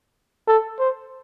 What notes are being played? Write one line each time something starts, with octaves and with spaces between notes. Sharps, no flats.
A4
C5